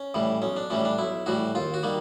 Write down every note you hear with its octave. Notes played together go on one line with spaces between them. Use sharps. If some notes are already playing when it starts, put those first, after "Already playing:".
Already playing: C#4
A2 E3 G3
B1 C#4
D4
A2 E3 G3 C#4
D4
B1 E4
A2 E3 G3 F#4
D#2 F4
F#4
D#3 G3 A#3